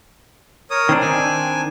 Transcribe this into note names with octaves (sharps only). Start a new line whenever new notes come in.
A#4 C#5 D#6
D#3 C4 D4
G#5